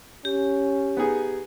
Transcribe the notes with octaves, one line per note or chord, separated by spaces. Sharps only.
C#4 G4
B3 D#4 G#4